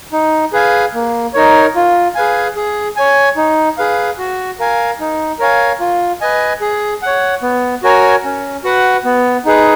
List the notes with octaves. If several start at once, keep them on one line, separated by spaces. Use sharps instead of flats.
D#4
G#4 B4 F5 G#5
A#3
D#4 A#4 C#5
F4
G#4 B4 F5 G#5
G#4
C#5 G#5
D#4
G#4 B4 F5
F#4
A#4 F5 G#5
D#4
A#4 C#5 F5 G#5
F4
B4 D#5 G#5
G#4
C#5 F#5
B3
F#4 A#4 C#5 G#5
C#4
F#4 B4 F#5
B3
D#4 G#4 B4